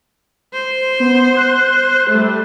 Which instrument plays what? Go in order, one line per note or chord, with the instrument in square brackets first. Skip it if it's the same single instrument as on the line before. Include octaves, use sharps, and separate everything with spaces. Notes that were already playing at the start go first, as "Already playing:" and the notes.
[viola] C5
[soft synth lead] B3
F#6
[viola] G3 A3